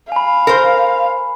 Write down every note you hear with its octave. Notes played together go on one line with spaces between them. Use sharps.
F5 G#5 B5
A#4 C5